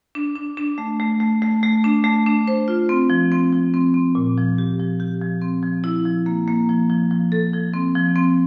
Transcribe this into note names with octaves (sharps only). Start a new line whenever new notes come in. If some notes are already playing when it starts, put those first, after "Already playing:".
D4
D4
D4
A3
A3
A3
A3
A3
D4
A3
D4
C5
F4
C4
F3
C4
F3
C4
C4
A#2
F3
G4
F3
G4
F3
C4
F3
E4
F3
A#3
A#3
F3
F3
F3
A4
F3
C4
F3
C4